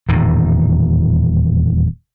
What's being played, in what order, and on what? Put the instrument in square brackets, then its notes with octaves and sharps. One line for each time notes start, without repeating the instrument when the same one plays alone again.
[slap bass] D#1 E2 A2 D#3